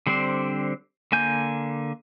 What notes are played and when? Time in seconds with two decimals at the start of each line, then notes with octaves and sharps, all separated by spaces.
0.07 D3 G3 C4 D4 C5
1.12 D3 A#3 G#5 G6